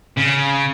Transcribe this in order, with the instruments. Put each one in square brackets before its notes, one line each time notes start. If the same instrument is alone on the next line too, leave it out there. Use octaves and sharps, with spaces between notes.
[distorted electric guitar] C#3